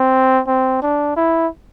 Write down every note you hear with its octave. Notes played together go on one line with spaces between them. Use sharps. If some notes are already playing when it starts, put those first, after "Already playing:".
Already playing: C4
C4
D4
E4